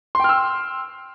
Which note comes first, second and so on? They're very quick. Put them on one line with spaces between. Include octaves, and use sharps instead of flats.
C6 G5 F6 E6